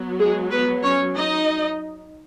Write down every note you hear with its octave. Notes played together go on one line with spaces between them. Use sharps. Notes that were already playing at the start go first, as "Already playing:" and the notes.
Already playing: F#3 B3
G#3 G#4
B3 B4
C#4 C#5
D#4 D#5